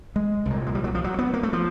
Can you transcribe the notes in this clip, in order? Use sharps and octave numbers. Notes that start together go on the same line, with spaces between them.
G#3
C2 A#2
G#3
G3
F#3
F3
F#3
B3
A#3
A3
F3